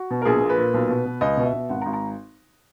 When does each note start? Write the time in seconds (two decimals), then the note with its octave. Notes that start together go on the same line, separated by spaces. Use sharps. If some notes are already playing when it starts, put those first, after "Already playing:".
Already playing: F#4
0.10 B2
0.22 A#4
0.25 A#1 G#4
0.42 A#2
0.49 B4
0.58 A#2
0.74 B1
0.89 B2
1.05 B2
1.21 C#2 D#5
1.37 B2
1.45 E5
1.53 B2
1.69 G#1 F#5
1.82 A#5
1.86 G#1
1.93 A#5